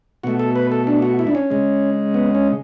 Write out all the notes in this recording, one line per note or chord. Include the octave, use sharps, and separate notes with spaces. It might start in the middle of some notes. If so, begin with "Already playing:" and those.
B2 A3 F#4
A4
B4
A4
D4
F#4
E4
D4
C#4
C#3 G#3
B3
C#4